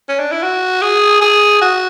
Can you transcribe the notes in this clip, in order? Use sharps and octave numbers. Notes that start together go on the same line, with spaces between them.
C#4
D4
E4
F#4
G#4
G#4
F#4